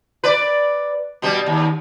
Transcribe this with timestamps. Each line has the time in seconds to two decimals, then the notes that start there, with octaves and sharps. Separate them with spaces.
0.24 B4 D5
1.22 B2 G3
1.46 D#2